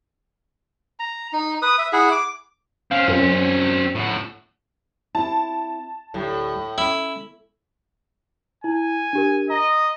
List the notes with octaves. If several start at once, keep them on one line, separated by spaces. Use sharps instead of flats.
A#5
D#4
B4 D#6
E5
E4 G#4 F#5
D6
C4 C#4 F5
F#2
A2 F#4
C4 E4 A5
D2 A2 G3
C#4 E4
E4 G#5
D4 G4 A#4
D#5 A#5